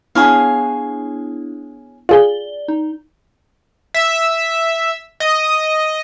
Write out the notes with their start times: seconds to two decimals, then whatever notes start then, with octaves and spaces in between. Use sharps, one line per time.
0.15 B3 D4 E4 G#4 C#5 F5
2.09 F4 G#4 D5 G7
2.68 D#4
3.94 E5
5.20 D#5